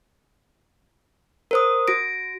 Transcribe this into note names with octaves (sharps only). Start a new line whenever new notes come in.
A#4 C5 D#6
F#4 A#6 D7